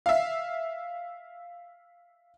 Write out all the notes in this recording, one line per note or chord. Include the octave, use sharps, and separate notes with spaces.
E5 F5